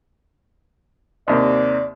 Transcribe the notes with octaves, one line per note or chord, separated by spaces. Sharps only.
D#2 C3 A#3 D5